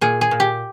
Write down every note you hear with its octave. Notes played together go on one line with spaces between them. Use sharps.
A#2 G#4
G#4
A#2
G4